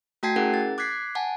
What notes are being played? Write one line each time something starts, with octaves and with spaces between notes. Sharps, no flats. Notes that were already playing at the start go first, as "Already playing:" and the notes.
A3 F#4 G5 A5 G#6 C7
C#4 E4 G#4 A#4 F#5
A6
D6 F#6 G#6 B6 C7
F#5 G#5 A5